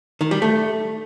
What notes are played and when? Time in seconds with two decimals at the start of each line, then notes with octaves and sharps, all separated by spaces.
0.21 D#3
0.31 G3
0.42 A3